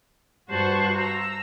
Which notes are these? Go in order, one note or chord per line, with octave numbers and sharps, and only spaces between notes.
G2 F#4 C5 F#5 A5 C#6
A#5 E6